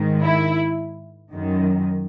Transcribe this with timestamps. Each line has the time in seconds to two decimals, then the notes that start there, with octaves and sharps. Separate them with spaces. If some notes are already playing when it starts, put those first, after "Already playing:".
Already playing: G#2 D#3
0.23 E4
1.31 F#2 D#3